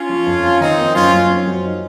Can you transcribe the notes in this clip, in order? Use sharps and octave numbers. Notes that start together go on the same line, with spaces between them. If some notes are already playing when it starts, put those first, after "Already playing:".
Already playing: C#4 F4
F3
F2
F3
D#3 C4 D#4
A#3
F#2 C#4 F4
F#2
C4
F#3
D#4